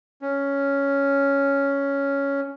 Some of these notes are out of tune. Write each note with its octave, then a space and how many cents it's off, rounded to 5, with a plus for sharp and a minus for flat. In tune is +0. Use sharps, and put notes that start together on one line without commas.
C#4 +5